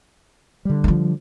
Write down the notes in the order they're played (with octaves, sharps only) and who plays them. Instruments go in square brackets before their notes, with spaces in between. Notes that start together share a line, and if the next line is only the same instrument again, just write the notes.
[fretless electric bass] D3 G3
[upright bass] E3 F3